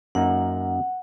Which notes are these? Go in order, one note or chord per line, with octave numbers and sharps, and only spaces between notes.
F#2 A#3 D#4 F#5